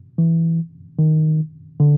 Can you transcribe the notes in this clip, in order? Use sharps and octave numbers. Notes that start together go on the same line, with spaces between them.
E3
D#3
D3